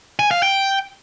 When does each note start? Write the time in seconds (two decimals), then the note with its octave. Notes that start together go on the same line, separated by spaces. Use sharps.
0.19 G#5
0.31 F5
0.43 G5